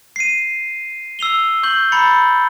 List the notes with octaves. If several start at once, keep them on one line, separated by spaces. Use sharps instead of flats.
C7 D#7
E6 C7 F7 G7
C#6 G6 F#7 G7
A#5 B5 A6 C#7